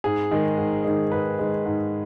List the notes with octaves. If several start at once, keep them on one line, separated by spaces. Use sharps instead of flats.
G#2 G#4
D#3 G#3
G#2
D#3 G#3
G#2 B4
D#3 G#3
G#2